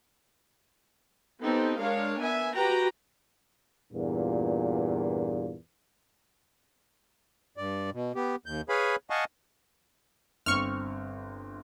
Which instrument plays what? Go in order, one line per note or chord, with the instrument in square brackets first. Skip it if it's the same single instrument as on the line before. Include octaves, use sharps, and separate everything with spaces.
[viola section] B3 C4 D#4 G4 A4
G#3 D4 A#4 C#5 F5
B3 E5 G#5
F#4 G4 B4 G5 A#5
[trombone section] E2 G2 A#2
[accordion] G2 D5
B2
B3 G4
D#2 G6
G#4 B4 C#5 F5 G#5 B5
D#5 F5 F#5 G#5 A5 C#6
[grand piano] G1 C4 [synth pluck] C#6 F6